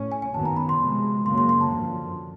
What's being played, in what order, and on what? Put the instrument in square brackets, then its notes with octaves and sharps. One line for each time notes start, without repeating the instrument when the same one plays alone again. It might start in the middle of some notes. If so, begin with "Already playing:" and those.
Already playing: [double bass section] A2 C#4
[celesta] G#5
G#5
[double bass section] F#2 D#3 F#3 B3 [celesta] A5
[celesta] A#5
B5
C6
[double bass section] C3 F3 G#3
[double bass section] F#2 C#3 F#3 A#3 [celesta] C6
[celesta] C6
C6
A5
[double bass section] F#2 D3 F3